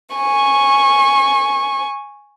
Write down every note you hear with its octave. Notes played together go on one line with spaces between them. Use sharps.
G#5 C#6